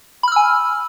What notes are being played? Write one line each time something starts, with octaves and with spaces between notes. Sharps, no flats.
G#5 B5 E6 F6